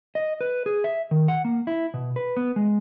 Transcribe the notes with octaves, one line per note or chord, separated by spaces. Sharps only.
D#5
B4
G#4
E5
D#3
F#5
A#3
E4
B2
B4
B3
G#3